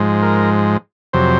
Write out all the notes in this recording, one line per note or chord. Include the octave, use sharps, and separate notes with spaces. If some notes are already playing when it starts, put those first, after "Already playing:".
Already playing: G#2 F3 G#3
A#4
F2 C3 F#3 C5